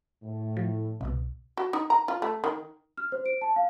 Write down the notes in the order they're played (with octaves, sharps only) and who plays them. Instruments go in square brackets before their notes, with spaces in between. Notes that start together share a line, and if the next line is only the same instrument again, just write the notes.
[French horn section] A2
[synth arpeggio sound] F3
C2 B2
[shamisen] F#4
D#4
A#5
F4
A3
D#3
[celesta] F6
C5
D7
A5
F5